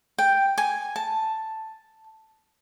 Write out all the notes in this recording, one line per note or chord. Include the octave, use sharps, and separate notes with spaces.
G5
G#5
A5